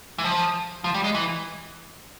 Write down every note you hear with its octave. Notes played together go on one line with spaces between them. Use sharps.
E3
F3
F3
G3
G#3
E3